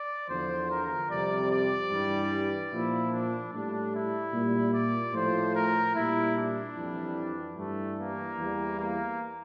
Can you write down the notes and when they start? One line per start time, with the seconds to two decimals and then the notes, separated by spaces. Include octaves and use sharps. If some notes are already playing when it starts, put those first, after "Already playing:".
Already playing: D5
0.28 E2 D3 F3 C5
0.69 A#4
1.09 F2 C3 G3 D5
1.50 D5
1.90 G2 E3 G3
2.72 A#2 F3 E4
3.12 D4
3.52 A2 G3 D4
3.92 E4
4.32 A#2 G3
4.73 D5
5.14 A2 F3 C5
5.54 A#4
5.95 A#2 G3 E4
6.35 D4
6.76 F2 E3 G3
7.56 G2 E3 G3 A3
7.97 A#3
8.37 E2 E3 G3
8.78 A#3